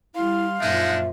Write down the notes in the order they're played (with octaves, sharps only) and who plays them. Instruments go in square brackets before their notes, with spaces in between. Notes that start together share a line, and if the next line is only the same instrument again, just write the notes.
[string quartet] G3 C6 [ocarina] E4 [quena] F5
[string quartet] F#2 A#2 F3 [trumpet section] G#3 D4 D#4 [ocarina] E5